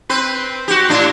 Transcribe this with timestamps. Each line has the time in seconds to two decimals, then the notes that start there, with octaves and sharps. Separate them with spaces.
0.09 C4 B4
0.68 F#4 G4
0.89 A2 D4